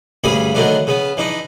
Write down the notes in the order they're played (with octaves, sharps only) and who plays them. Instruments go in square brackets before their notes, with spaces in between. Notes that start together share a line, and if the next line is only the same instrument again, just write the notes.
[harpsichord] D2 G2 C#3 D4 G#4 B5
D3 D#3 F#3 A3 B3 D4
C#3 B3
E3 D4 D#4